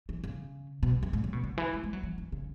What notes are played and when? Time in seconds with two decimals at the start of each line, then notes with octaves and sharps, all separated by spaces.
0.09 E3
0.24 C#3
0.83 B2
1.03 F#2
1.13 G#2
1.24 C#3
1.33 B2
1.44 C#3
1.58 E3
1.73 G#3
1.84 G#3
1.93 F#3
2.03 E3
2.18 E3
2.32 C#3